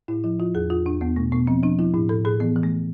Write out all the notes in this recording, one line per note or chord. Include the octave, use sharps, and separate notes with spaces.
A2 E4
F3 E4
F3 F4
E2 G#4
E2 F4
E2 D4
E2 B3
B2 A3
B2 B3
F3 C4
F3 D4
F3 E4
A2 E4
A2 A4
A2 G#4
E3 B3
E3
A3